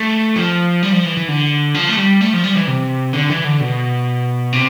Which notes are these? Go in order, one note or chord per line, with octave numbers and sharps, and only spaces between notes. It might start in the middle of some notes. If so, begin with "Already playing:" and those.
Already playing: A3
F3
G3
F3
E3
E3
D3
F3
A3
G3
A3
F3
G3
E3
C3
D3
E3
D3
B2
C3